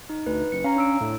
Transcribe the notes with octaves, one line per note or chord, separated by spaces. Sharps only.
D#4
D2 B4
F#1 C#7
C#4 F5 A#5
D4 E6 D7
A2